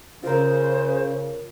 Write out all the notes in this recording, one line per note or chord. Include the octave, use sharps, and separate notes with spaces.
C#3 F4 A#4 C5